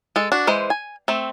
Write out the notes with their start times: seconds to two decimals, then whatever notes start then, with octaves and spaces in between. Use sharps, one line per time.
0.16 G#3 A4
0.32 D4 F#4
0.47 E3 G#3 C5
0.70 G#5
1.08 A3 C4